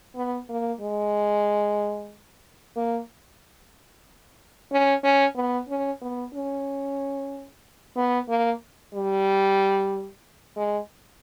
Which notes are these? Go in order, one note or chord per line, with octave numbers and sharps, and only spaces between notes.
B3
A#3
G#3
A#3
C#4
C#4
B3
C#4
B3
C#4
B3
A#3
G3
G#3